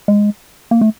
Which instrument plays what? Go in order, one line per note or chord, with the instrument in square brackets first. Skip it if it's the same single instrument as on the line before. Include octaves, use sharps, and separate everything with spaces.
[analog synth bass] G#3
A#3
A3